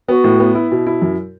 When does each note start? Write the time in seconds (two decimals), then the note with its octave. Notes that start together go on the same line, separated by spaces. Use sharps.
0.08 B3 F#4
0.24 A2
0.40 B3
0.55 E4
0.72 B2
0.87 E4
1.02 F#2